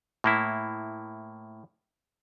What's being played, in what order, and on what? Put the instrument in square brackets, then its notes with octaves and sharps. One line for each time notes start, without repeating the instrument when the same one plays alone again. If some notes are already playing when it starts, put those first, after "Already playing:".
[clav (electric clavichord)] A2 A#3 E4